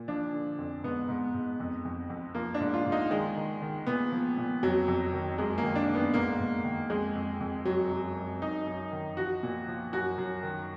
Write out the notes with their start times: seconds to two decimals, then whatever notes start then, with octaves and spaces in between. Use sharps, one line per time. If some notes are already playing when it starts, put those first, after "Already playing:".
Already playing: A#2
0.08 F3 D4
0.33 D3
0.59 F2
0.84 G#2 B3
1.09 G#2
1.34 G#2
1.60 F2
1.85 F2
2.10 F2
2.35 F3 A#3
2.54 D4
2.60 G#2
2.74 F4
2.86 G#2
2.92 D#4
3.11 D#3 G#3
3.36 D#3
3.62 D#3
3.86 A#2 B3
4.12 F3
4.38 A#2
4.63 F2 F#3
4.88 F2
5.13 D#3
5.38 F#2 G#3
5.58 A#3
5.63 D#3
5.76 D4
5.89 D#3
5.95 B3
6.14 G#2 A#3
6.40 G#2
6.64 D#3
6.90 F2 G#3
7.15 F2
7.41 F2
7.65 F#2 F#3
7.91 F#2
8.16 F#2
8.41 F#2 D#4
8.67 F#2
8.92 D#3
9.17 F3 F#4
9.43 A#2
9.68 F3
9.93 F#2 F#4
10.18 F#2
10.43 D#3